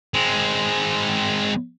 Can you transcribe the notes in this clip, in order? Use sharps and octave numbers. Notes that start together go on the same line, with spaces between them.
G#3 C4